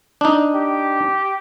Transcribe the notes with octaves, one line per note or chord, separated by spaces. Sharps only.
D4 D#4
G4